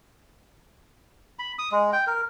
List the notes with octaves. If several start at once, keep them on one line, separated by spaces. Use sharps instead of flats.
B5
D#6
G#3
G5
A#4